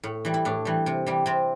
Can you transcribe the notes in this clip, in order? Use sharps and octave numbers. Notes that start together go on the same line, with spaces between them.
A2
E3 G3
E4
A2 D4
E3 G3
C3
E3 G3
C3 C4